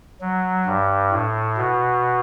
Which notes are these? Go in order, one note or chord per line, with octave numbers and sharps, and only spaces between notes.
F#3
G2
A2
B2